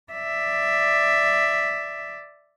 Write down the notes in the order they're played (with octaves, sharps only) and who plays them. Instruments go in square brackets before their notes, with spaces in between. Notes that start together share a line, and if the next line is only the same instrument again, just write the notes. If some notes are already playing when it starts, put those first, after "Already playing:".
[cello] D5 E5